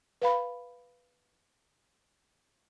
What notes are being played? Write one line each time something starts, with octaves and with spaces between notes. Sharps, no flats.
B4 F5 B5